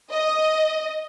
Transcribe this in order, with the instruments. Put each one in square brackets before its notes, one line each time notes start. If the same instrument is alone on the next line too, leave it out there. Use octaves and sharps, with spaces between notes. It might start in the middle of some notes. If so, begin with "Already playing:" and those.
[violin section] D#5